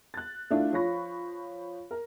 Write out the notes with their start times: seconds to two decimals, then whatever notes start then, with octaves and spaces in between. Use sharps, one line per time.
0.14 F#6 A6
0.50 A3 D4 E4 F4
0.73 F3 F4 C#5 B5 C#6 A#6
1.91 A#4